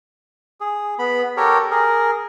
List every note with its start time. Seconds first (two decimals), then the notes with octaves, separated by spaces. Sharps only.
0.61 G#4
0.99 B3 B5
1.37 G4 A4 A#4 C#5
1.71 G#4 A#4